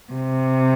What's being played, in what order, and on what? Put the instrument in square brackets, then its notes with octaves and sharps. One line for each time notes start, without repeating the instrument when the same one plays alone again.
[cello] C3